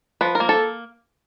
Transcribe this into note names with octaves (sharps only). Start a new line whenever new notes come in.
F3 B4
A#4
A#3
A4